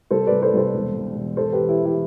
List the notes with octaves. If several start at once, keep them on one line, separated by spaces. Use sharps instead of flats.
C2 A4 C5
C2 B4 D5
A4 C5
C2 A4 C5
E1
E1
E1
E3 A4 C5
G4 B4
E3
E4 G4
E3
E4 G4